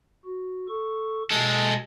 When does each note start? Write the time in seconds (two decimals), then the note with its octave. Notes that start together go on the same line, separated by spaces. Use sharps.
0.25 F#4
0.68 A4 C#6
1.31 B2 G#3 A4 A5